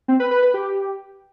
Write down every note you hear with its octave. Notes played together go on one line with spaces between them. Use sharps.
C4
B4
B4
B4
G4